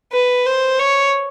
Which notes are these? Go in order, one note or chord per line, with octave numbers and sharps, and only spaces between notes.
B4
C5
C#5